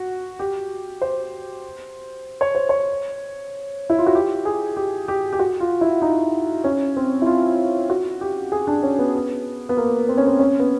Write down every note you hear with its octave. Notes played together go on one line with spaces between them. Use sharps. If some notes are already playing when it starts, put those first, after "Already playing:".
Already playing: F#4
G4
C5
C#5
C5
C#5
E4
F4
F#4
G4
G#4
G4
G4
G4
F#4
F4
E4
D#4
C#4
C4
E4
F4
F#4
G4
G#4
D4
C#4
B3
B3
A#3
C4
C#4
C4
C#4
B3